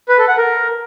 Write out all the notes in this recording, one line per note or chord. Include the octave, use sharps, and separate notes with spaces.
B4
A4
F#5
A#4